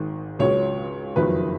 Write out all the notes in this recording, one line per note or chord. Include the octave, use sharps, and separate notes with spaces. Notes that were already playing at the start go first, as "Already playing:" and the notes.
Already playing: G#1 G#2 D#3
C#2 C#3 F#3 C#5
F#1 F2 D#3 F#3 B4